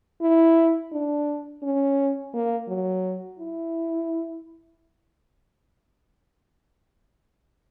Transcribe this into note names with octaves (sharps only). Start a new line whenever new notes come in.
E4
D4
C#4
A#3
F#3
E4